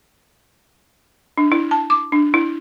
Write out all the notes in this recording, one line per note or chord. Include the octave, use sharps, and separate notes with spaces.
D4
E4
A5
D6
D4
E4